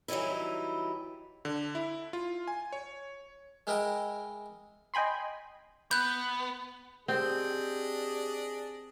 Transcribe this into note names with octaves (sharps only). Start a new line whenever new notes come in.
E3 F#3 G3 D#4 E4
D3
E4
F4
G#5
C#5
G#3 E4 A#4 D#5 E5 G5
D#5 G5 G#5 B5 C6
B3 F#6 G6
C4 D4 G4 G#4 D#5